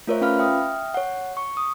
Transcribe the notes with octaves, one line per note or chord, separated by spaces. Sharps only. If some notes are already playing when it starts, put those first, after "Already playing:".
A3 F4 A#4 C5 C#5 E5
C#4 F4 B4 F5 B5 F6
E5 G5 D#6 F6
C#5 F#5
C#6
D#6